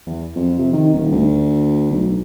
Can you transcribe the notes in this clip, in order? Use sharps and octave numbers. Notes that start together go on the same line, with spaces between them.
E2
F2
C3
D#3
D#1
D2
B1